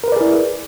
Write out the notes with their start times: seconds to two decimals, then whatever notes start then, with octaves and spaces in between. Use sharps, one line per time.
0.04 A#4
0.08 B4
0.12 D5
0.16 G#4
0.21 E4